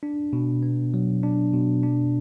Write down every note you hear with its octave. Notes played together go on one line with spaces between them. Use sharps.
D4
B2
B3
F#3
D4
B2
D4